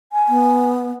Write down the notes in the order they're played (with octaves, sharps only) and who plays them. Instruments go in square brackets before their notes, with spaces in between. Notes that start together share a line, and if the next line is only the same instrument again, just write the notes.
[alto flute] G#5
[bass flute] B3